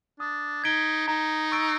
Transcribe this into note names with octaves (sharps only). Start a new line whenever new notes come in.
D4 D#6
D#4 G#6 B6 D7 G7
D#4 A#5
C#6 E6 A6 D7